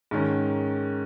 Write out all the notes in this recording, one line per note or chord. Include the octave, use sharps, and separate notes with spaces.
G#2 D#3 C#4 A#4